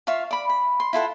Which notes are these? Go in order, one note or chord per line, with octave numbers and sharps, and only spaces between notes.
F4 E5 F5 C#6
D5 B5
B5
C6
E4 F4 A4 F#5